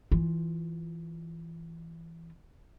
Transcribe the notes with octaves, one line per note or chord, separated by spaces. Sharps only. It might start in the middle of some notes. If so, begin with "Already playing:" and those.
E3 F4